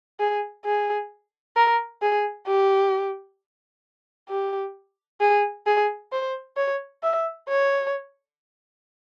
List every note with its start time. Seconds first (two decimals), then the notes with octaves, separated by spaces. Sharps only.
0.20 G#4
0.65 G#4
1.56 A#4
2.02 G#4
2.47 G4
4.29 G4
5.21 G#4
5.66 G#4
6.12 C5
6.57 C#5
7.03 E5
7.49 C#5